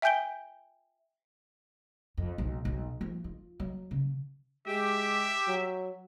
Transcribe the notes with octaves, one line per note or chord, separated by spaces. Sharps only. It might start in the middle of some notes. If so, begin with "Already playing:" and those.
E5 G5 G#5 G6 D7 G7
F2
B1
B1
F3
F4
F#3
C#3
G#3 G4 E5 G5
F#3